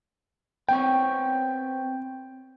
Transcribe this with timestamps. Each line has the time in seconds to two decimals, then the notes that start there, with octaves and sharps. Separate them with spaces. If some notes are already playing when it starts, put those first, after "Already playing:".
0.69 B3 C4 C#5 G5